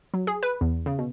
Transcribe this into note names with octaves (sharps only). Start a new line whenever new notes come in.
F#3
G#4
B4
E2
C#3
B2